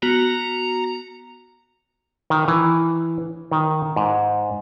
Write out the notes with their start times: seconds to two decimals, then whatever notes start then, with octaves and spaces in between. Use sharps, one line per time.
0.03 B3 F#4 A#5 C#7
2.30 D#3
2.48 E3
3.51 D#3
3.96 G#2